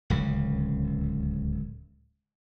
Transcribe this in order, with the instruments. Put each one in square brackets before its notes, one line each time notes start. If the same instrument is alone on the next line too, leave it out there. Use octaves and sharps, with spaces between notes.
[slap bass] D1 C#2 C#3